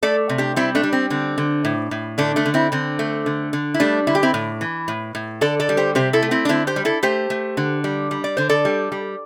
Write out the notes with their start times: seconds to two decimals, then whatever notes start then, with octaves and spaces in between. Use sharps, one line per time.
0.03 A3 A4 D5
0.29 C3
0.38 D4 G4
0.56 G3 C4 E4
0.75 A3 D4
0.83 G3
0.93 C4
1.10 D3 C4
1.38 D3
1.65 A2
1.91 A2
2.18 D3 A3 D4
2.36 A3 D4
2.45 D3
2.54 C4 E4
2.72 D3 C4
2.99 A3
3.26 D3
3.53 D3
3.74 E4
3.80 G3 A3 D4
4.07 D3 E4
4.15 G4
4.23 C4 E4
4.34 A2
4.61 E3
4.88 A2
5.15 A2
5.41 D3 A4 D5
5.60 A4 D5
5.69 G3
5.77 G4 C5
5.95 C3 G4 C5
6.13 E4 A4
6.22 A3
6.31 C4 E4
6.45 D4
6.49 D3 C4 E4
6.67 G4 C5
6.76 G3
6.85 E4 A4
7.03 A3 G4 C5
7.30 A3
7.57 D3
7.84 G3
8.11 G3
8.24 D5
8.37 D3 C5
8.49 A4 D5
8.65 G3
8.92 G3